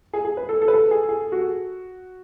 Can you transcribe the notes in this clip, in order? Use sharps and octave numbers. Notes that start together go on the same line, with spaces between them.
G#4
G#4
B4
A4
A4
B4
A4
G#4
G#4
F#4